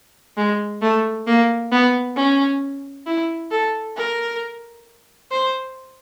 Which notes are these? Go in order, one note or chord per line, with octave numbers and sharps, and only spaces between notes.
G#3
A3
A#3
B3
C#4
E4
A4
A#4
C5